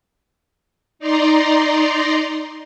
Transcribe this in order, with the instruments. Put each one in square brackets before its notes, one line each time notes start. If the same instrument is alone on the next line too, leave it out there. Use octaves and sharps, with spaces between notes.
[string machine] D#4 D5 A#5 C6